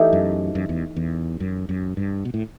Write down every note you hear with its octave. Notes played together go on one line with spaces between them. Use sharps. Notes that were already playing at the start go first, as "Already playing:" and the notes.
Already playing: E3 A3 D#4 G4
F#2
F#2
E2
E2
F#2
F#2
G2
B2
A2